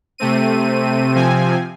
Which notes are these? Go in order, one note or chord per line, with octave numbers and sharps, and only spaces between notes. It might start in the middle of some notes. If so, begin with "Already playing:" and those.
C3 A3 C4 D#7
C3 F3 C4 G#5